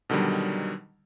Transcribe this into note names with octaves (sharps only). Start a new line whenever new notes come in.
B2 D3 D#3 F#3 G3